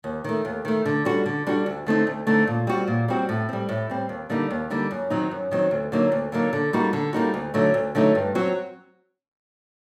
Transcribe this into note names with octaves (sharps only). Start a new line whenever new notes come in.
D#2
D#3 A3
D#2
D#3 A3
D3
G3 D4 F#4
D3
G3 D4 F#4
D2
D3 A3 C4 D#4
D2
D3 A3 C4 D#4
A#2
G3 C4 F#4
A#2
G3 C4 F#4
A2
G3 C4
A2
G3 C4
D#2
D3 G3 A#3 D#4
D#2
D3 G3 A#3 D#4
F#2
D#3 F#3 C4 D#4
F#2
D#3 F#3 C4 D#4
D2
D3 F#3 A#3 D#4
D2
D3 F#3 A#3 D#4
D3
G3 A#3 D#4 F#4
D3
G3 A#3 D#4 F#4
D2
D3 F#3 A3 D#4
D2
D3 F#3 A3 D#4
G2
F#3 C4 F#4